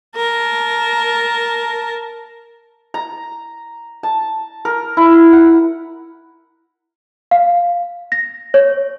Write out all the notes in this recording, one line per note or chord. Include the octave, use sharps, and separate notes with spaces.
A#4 A5
A#5
A5
A#4
E4
F#5
F5
A#6
C#5